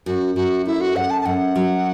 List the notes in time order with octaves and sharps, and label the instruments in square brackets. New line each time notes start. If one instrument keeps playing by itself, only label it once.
[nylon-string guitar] F#2 [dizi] F#4
[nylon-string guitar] F#2 [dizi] F#4
[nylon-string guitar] A3 [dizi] E4
[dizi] F#4
[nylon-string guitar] F#2 [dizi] F#5
[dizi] A5
A5
[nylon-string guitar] F#2 [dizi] F#5
[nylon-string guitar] F#3